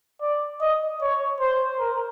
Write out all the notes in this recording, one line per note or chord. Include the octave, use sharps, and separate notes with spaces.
D5
D#5
C#5
C5
A#4